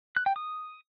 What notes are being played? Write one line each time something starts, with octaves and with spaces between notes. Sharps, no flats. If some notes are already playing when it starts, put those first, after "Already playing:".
F#6
G5
D#6